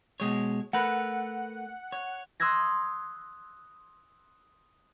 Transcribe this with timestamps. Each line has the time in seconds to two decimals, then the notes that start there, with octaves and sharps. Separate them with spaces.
0.20 B2 G#3 C#5
0.73 A3 A#4 B4 F#5
1.92 C#5
2.40 C6 D#6 E6 F#6 G#6 A#6